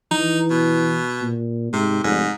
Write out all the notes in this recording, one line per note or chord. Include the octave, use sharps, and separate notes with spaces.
E3 D#4
B2
A#2
G#2 C3
F1 G#2